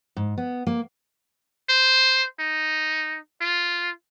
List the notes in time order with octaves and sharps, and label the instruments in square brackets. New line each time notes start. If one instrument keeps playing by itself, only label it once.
[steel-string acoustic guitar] G#2
B3
A#3
[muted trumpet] C5
D#4
F4